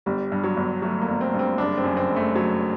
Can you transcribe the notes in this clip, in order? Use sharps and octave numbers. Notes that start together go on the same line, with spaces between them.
G1 G3
G2
F#3
G1
F#3 A3
A#3
G1
C4
G2
C4
F#1 D4
C4
F#2
C4
F#1
A3
F#3